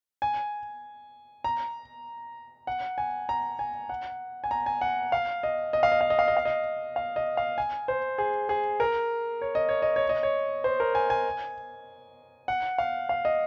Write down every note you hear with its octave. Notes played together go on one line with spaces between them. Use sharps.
G#5
A#5
F#5
G#5
A#5
G#5
F#5
G#5
A#5
G#5
F#5
F5
D#5
D#5
F5
D#5
F5
D#5
F5
D#5
F5
D#5
F5
D#5
F5
G#5
C5
G#4
G#4
A#4
C#5
D#5
C#5
D#5
C#5
D#5
C#5
C5
A#4
G#5
G#5
F#5
F5
F5
D#5